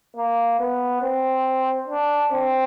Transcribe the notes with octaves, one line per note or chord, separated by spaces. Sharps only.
A#3
B3
C4
D4
C4